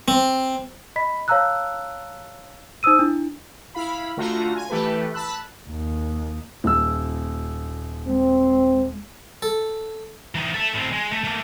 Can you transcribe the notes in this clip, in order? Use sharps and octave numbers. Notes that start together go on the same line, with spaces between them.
C4
D#5 B5 B6
C#5 F5 A5 A#5 E6 F#6
D#4 C5 D#6 E6 D#7
D4 E4
E4 F5 B5
D3 A3 F4 F#4 A#5
G#5
E3 A3 G4 A4 B4
A5 B5 E6 F#6
D#2
D#1 E6
G#3 C4
A4
E3 D#4
A4 E5
A2 C4
G#3
A3
A3 A#3